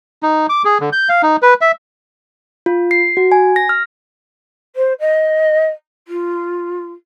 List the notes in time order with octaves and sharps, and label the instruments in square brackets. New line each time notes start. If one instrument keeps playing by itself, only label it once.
[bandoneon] D#4
D6
G#4
D3
G6
F5
D#4
B4
E5
[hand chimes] F4
C7
F#4
G#5
A#6
F6
[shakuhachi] C5
D#5
F4